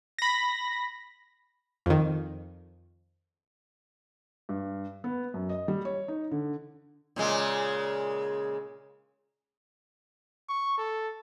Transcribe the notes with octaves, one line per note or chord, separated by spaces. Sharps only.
B5 A#6
F2 D#3
G2
B3
F#2
D#5
G3
C#5
D#4
D3
A#2 C#3 G#3
C#6
A4